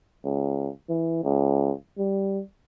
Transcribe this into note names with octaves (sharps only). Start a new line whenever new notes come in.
C#2
E3
C#2
G3